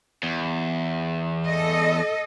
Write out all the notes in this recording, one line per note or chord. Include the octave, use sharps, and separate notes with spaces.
E2
A4 D#5